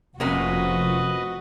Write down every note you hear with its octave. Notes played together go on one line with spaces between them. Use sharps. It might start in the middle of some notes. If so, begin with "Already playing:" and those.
F1 C3 F3 A#3 C#4 F#4 B4 D#5